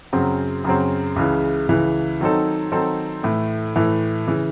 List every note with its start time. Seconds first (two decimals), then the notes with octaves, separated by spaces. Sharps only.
0.13 F#2 C#3 F#3 C4
0.64 F#2 C#3 F#3 C4
1.16 C#2 C#3 E3
1.69 C#2 C#3 E3
2.20 D#3 F#3 C4 D#4 A4
2.72 D#3 F#3 C4 D#4 A4
3.23 A2 E3 A3
3.76 A2 E3 A3
4.28 C#3 E3